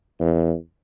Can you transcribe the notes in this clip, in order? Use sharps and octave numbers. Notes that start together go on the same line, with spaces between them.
E2